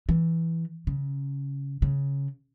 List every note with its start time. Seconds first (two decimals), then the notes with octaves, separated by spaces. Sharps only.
0.09 E3
0.87 C#3
1.82 C#3